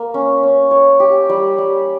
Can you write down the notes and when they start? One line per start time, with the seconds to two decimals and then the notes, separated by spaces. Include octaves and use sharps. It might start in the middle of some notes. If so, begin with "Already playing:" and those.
Already playing: A#3
0.14 C#4
0.43 C#4
0.71 C#5
1.00 G4
1.29 G3
1.58 G3